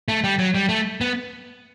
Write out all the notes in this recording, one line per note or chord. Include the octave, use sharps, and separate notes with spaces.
A3
G3
F#3
G3
A3
B3